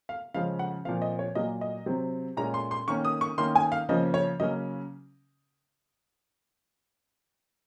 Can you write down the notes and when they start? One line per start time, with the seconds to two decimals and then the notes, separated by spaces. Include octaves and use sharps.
0.09 F5
0.34 C#3 F3 G#3 C#4 F5
0.59 F#5
0.85 A#2 F3 C4 F5
1.02 D#5
1.19 C#5
1.35 A#2 F#3 A#3 D#5
1.61 D#5
1.86 C3 F#3 C4
2.37 A#2 G#3 C#4 A#5
2.54 C6
2.71 C6
2.88 D#3 A#3 C#4 C#6
3.05 D#6
3.21 C#6
3.38 D#3 A#3 C#4 C6
3.55 G#5
3.72 F5
3.89 C#3 F3 A#3 C#4 D#5
4.14 C#5
4.39 C#3 F#3 A#3 C#4 D#5